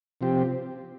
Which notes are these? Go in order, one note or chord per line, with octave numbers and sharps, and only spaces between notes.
C3 F3 C4 G4